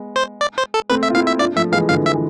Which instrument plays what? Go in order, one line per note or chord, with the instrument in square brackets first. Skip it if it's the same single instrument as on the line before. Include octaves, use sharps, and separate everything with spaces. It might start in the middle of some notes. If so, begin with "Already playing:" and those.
Already playing: [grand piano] G#3 B3
[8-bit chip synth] C5
D5
C5
A4
[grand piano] A3 C4 [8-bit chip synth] B4
[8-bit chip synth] E5
[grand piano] F4
[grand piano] C4 E4 [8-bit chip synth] F5
[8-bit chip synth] E5
[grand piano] D4 F4 [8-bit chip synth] D5
[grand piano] F3 A3 [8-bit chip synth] E5
[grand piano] E3 G#3 [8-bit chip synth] F5
[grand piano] D3 F3 [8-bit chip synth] F5
[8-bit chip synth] E5
[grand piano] E3